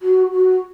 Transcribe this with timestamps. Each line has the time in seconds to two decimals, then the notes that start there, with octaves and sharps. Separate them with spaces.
0.02 F#4
0.32 F#4